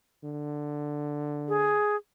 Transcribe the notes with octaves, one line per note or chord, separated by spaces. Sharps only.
D3
G#4